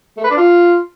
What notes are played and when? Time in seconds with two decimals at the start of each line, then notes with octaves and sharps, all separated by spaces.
0.17 A3
0.24 B4
0.31 D4
0.37 F4